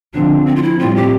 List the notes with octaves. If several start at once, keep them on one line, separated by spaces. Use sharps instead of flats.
D3 F3 C4 D4
C4
F4
E4
A2 G3 C4 F4
G4